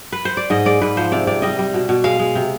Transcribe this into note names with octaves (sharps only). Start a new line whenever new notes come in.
B4
C5
D5
G#2 D#5
G#3 D5
G#2 B4
F3 C5
C3 D5
C3 D5
G3 D#5
G3
B2
B2
G#3 F5
G#3
C3